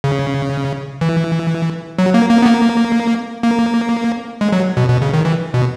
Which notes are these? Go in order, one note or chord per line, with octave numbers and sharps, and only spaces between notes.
C#3
E3
F#3
A#3
A#3
B3
A#3
A#3
G#3
F#3
B2
B2
C#3
D#3
E3
B2